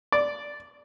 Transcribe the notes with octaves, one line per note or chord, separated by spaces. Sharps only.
D5